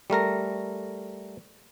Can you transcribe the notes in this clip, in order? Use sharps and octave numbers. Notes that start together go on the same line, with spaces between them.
G3 A3 A#4 A#5